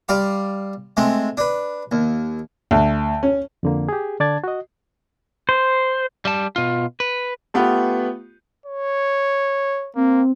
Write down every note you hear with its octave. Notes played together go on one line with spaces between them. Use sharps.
G3 D5 F5 C6
G#3 A3 C4
D4 B4
D#2
D2
C#4
F2 D3 A#3
G4 G#4
D3 D4 D5 A5 G#6 A6
F#4 D#5
C5
G3 A5
B2 F4
B4
A3 B3 F4 G4 B4
C#5
A#3 C4